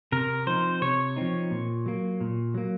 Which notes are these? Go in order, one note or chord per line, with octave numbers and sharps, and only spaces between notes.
C3 A#4
F3 C4 D#4 C5
C3 C#5
F3 C4 D#4
A#2
F#3 A#3
A#2
F#3 A#3